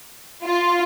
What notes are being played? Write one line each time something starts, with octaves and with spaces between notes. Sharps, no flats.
F4